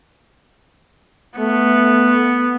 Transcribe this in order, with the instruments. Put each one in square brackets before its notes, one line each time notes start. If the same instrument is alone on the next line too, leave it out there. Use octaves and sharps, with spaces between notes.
[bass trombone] A3 [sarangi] B3